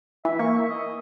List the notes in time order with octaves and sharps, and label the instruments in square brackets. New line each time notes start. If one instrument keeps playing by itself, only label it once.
[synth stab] E3 [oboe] E5
[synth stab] A#3 [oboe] C#6
[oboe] E5
D#5